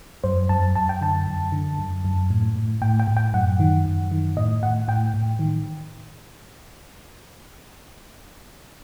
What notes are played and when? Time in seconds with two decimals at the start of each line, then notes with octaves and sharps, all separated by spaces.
0.24 F#2 C5
0.49 F#2 A5
0.76 F#2 A5
0.89 G5
1.01 D3 A5
1.27 F#2
1.52 D3
1.79 F#2
2.05 F#2
2.30 A2
2.56 A2
2.82 A2 G5
3.00 G5
3.08 A2
3.17 G5
3.33 F#2 F#5
3.60 D#3
3.86 F#2
4.11 D#3
4.37 A2 D#5
4.63 A2 F#5
4.88 A2 G5
5.14 A2
5.39 D#3